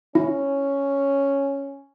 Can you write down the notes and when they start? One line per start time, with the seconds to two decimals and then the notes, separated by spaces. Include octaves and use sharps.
0.15 C#4 E4